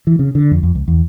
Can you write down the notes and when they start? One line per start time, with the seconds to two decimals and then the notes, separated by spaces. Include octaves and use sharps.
0.07 E3
0.19 C#3
0.35 D3
0.51 F2
0.63 F2
0.75 C#2
0.88 E2